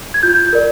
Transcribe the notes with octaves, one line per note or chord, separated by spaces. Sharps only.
G#6
F4 G6
A#4 D5